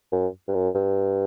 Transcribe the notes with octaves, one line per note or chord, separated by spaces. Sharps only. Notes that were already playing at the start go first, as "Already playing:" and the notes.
F#2
G2
F#2
G2